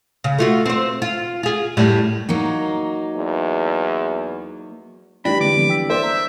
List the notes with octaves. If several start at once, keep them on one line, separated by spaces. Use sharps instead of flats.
C#3
A3 F4 F#4
C4 C5
F4
F4 G#4
F#2 A2 G3
F#3 A#3 D#4
E2
E3 G3 A3 D4 G5 B5 A#6
D3 G#3 C4 D6
D3 F3 B3
G5 E6 B6
A#3 C5 D5 E5
A#5